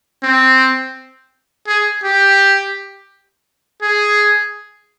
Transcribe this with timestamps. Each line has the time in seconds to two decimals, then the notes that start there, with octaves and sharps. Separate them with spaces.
0.23 C4
1.67 G#4
2.04 G4
3.83 G#4